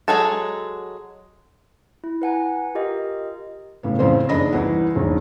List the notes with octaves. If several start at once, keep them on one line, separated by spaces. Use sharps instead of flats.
F#3 G#3 A4
E4
B4 F#5 G#5 A#5
F4 G4 A#4 D#5
A2 C#3 B3
A1 F2 C#3 C4 C5
F#1 D#2 D4 D#5 B5 A#6
C2 E3 F#5
E1 A#1 D#2 G#2